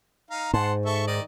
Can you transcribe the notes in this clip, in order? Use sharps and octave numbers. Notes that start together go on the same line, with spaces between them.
D#4 F5 A#5
G#2 F#5 A5 C6
A4 E5 C#6
D#3 D5 D#5